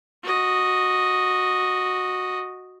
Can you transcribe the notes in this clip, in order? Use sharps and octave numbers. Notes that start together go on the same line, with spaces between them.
F#4 D#5